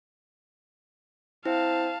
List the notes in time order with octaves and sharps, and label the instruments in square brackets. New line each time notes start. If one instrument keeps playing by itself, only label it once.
[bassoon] C4 [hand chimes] E4 [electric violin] F5 A5